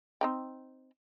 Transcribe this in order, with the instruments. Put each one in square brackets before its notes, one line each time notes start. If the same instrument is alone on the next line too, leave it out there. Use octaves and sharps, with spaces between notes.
[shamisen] C4 D#4 G5